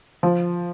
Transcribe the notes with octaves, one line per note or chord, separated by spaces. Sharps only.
F3